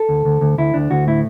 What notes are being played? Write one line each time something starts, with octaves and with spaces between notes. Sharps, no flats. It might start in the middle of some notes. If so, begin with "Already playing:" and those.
Already playing: A4
D2
D2
D2
D2 E4
D2 D4
D2 F#4
A2 E4